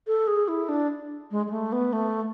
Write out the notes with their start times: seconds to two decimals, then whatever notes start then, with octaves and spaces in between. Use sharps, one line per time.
0.07 A4
0.27 G#4
0.48 E4
0.69 D4
1.31 G#3
1.46 G#3
1.51 A3
1.72 B3
1.93 A3